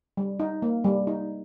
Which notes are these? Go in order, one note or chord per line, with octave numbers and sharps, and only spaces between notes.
G3
D#4
A#3
G3
D#4